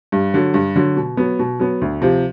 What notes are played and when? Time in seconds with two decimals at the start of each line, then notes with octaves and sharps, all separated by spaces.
0.12 G2
0.34 D3 F#3
0.54 G2
0.76 D3 F#3
0.97 B2
1.17 F#3 B3
1.39 B2
1.60 F#3 B3
1.82 D2
2.02 C3 F3